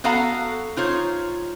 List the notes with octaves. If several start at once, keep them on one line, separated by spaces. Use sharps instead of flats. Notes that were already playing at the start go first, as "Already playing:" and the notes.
B3 F#4 A4 F5 F#5 A#5
D#4 F4 C5 C#5